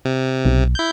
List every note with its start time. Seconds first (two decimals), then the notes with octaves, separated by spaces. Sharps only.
0.05 C3
0.45 B1
0.75 E4 G6